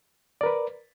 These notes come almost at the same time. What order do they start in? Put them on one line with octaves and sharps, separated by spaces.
D5 A#4 B4